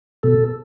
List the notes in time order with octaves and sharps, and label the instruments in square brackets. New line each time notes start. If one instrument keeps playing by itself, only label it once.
[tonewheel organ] B2 A4